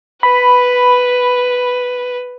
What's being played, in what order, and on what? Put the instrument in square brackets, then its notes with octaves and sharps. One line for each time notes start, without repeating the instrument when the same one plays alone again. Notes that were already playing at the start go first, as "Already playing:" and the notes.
[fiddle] B4 [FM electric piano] B5